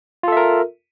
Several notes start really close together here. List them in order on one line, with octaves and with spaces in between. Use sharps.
F4 A4 E5 A#4